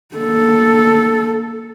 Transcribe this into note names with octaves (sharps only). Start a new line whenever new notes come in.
A#3 A4